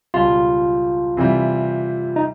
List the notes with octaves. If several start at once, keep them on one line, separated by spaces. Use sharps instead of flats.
C#2 B2 G3 F4
C3 E3 G3
D#4